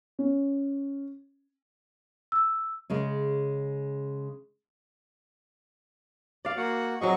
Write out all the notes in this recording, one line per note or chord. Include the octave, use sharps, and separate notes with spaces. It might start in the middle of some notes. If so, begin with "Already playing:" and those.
C#4
E6
C#3 G#3 C#4
D5 F5
A#3 F#4 F#5
F#3 C4 G#4 D#5 C#6